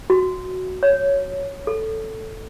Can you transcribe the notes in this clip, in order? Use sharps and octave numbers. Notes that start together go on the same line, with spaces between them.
F#4
C#5
A4